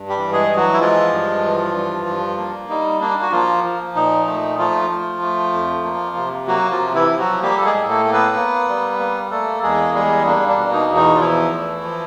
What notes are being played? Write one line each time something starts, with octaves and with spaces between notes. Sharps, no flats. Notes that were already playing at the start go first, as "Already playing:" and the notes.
Already playing: G2
G3 G4
E3
G#3 G#4
E3
F#3 F#4
E4
F3 G#3 F4
G2
E3
G2
G2
A#3
G3 D#4
A#3 D4
F#4
F3 A#3 F4
F3
A#2 D#4
A3 D#4
F3 A3 F4
A3
A3
F2
A#3
C3
F#3 A#3 F#4
F3 F4
C3
E3 E4
F3
F#3 F#4
G3 A#3 G4
A4
G#3 G#4
A2
A3 A4
A#3
B3 B4
A#3
G3
A#3
A3 A#3 A4
E2 G#3 G#4
G3 G#3 G#4
A#3 D4
D4
B2
D#4
E2
D#4
F4
E3 F3 E4
A3
F3